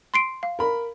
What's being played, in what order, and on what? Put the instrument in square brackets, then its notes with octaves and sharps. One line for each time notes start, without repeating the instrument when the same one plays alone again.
[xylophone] C6 C7 D7
F5
[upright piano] A#4 B5